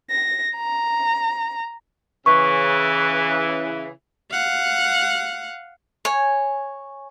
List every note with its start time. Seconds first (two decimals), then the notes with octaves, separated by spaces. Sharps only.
0.11 A#6
0.57 A#5
2.26 C#3 E3 C#6
4.31 F5 F#5
6.05 C#5 G#5